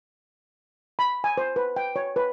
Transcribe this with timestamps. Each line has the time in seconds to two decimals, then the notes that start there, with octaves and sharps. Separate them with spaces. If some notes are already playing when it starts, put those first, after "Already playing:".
0.99 B5
1.24 G#5
1.38 C5
1.56 B4
1.76 G5
1.96 C#5
2.16 B4